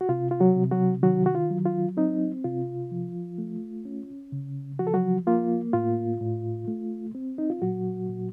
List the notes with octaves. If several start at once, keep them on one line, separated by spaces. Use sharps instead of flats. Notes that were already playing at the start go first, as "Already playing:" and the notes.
F#4
C3 F4
F4
F#3 F#4
C3
F#3 F#4
D#3 F#3 F#4
F#4
F4
F#3
F4
C4 D#4
C3 F4
F3
A3
C#4
C#3
F3 F#4
A4
F#3 F#4
A#3 F4
A2 F4
A2
A3
C4
D#4
F4
A#2 F#3 F#4
A#2